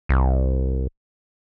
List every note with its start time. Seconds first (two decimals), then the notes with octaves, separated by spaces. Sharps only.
0.09 C2